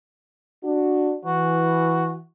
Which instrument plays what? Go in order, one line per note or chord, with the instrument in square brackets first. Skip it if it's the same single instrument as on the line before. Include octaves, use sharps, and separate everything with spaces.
[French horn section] D4 F#4
[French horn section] E3 [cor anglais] F#4